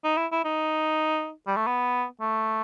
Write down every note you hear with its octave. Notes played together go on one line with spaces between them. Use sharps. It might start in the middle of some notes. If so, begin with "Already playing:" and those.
D#4
E4
E4
D#4
G3
A3
B3
A3